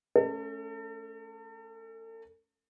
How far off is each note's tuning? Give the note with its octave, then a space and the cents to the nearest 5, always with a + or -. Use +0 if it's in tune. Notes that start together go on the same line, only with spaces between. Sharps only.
A3 -20 C#4 +0 A4 +40